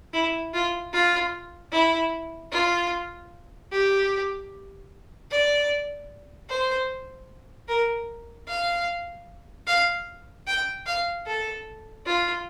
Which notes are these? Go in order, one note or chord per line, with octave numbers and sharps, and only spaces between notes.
E4
F4
F4
E4
F4
G4
D5
C5
A#4
F5
F5
G5
F5
A4
F4